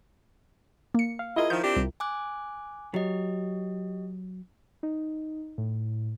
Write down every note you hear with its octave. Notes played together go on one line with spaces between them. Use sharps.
A#3 C#7
F5
E4 F4 G#4 A#4 D#5
D#3 F3 G6
C4 D4 G4
C2
G#5 D6 F#6
F#3 G4 D#5
D#4
A2